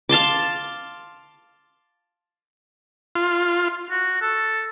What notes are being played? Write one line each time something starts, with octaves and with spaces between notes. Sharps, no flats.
F5 A5 C6 D6
F4
F#4
A4